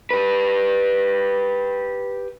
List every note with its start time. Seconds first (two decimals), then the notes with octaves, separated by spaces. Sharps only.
0.11 G4 B4